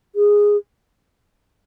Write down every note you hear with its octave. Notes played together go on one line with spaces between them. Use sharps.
G#4